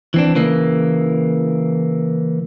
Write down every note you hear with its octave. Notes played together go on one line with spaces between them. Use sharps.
E3 C4 D4
C#3 E3 A#3